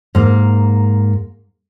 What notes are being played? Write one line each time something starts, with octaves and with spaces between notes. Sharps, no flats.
G#2 A#3